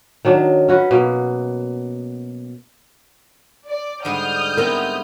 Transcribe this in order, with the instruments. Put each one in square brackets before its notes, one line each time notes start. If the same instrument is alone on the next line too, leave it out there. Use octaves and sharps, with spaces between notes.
[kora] D#3 F#3 D4
C#4 F#4 B4
B2 A#3
[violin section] D5
[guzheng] G#2 D3 G3 [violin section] D#6 F6 G6
[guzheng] B3 C4 E4 [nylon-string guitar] A#4